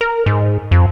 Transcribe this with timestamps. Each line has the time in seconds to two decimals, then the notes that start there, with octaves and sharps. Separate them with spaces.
0.01 A#4
0.26 G#2
0.71 F2